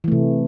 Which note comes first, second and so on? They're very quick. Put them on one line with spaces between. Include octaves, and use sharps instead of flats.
E3 A3 C3